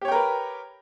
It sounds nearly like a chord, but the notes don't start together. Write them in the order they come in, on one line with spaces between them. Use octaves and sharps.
G4 C#5 G5 A#4 B4